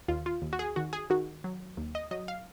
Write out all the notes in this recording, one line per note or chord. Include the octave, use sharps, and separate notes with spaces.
D#2 F4
F4
D#2
F#4
G#4
D#3 F#4
G#4
D#3 F#4
F#3
D#2
D#5
F#3 D#5
F5